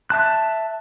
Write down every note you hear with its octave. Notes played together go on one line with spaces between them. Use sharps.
E5 A5 F#6